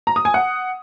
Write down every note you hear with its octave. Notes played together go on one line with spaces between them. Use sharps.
A#5
D#6
G#5
F#5